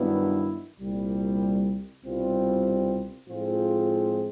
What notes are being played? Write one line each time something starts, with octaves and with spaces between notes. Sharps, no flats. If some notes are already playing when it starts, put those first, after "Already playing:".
Already playing: G2 D#3 F#3 B3 E4
C2 A#2 G3
C2 B2 G3 C4 F4
A2 F3 G#3 C4 F4